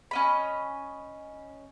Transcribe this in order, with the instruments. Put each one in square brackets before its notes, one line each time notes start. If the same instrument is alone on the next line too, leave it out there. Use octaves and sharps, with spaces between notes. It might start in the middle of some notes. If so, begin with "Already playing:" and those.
[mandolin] C#4 D#5 B5